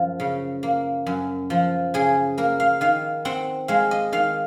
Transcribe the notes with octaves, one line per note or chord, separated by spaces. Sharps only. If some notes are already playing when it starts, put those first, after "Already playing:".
Already playing: F#2 F3
C#3
A#3
F#2
F3
C#3 G#4
A#3 A#4
F5
D#3 F5
C4 F#5
G#3 F5
D#5
D#3 F5